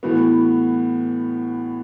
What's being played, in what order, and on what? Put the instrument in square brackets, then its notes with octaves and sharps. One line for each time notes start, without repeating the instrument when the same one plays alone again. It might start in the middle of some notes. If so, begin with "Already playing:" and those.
[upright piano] A2 E3 B3 F#4